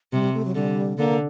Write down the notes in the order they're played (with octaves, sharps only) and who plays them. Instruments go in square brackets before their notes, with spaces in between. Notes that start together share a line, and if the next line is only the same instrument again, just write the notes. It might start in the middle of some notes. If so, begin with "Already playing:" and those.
[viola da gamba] C3 [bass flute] G3
[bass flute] A3
F#3
[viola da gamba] D3 [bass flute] G3
[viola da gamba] D3 [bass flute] A#3